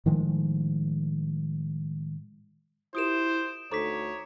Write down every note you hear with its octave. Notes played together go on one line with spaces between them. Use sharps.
A2 D#3 F3 G#3
E4 F4 G4 A#4 C5 D#6 D7 E7
D2 D#4 A4 C5 C#5 A#5 D6 B6